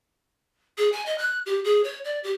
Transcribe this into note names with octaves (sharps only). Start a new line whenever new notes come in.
G#4
G#5
D#5
F#6
G4
G#4
C#5
D5
G4